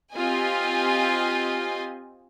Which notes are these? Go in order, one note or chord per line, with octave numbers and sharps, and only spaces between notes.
C4 F4 G4 D#5 G#5